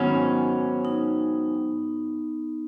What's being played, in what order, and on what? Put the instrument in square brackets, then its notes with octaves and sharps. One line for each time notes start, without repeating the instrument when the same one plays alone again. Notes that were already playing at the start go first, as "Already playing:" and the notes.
Already playing: [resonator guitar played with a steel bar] G#2 D#3 F#3 C#4 [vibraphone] B3
[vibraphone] D#4